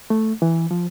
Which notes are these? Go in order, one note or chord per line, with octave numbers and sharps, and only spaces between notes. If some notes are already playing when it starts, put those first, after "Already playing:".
A3
E3
F3